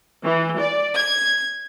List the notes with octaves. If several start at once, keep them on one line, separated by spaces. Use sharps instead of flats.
E3
D5
G#6